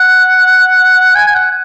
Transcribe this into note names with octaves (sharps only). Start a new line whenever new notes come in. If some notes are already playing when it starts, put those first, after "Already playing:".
Already playing: F#5
G#5
G#5
F#5